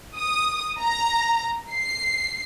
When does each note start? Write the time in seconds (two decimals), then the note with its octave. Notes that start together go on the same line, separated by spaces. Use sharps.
0.17 D#6
0.80 A#5
1.71 C7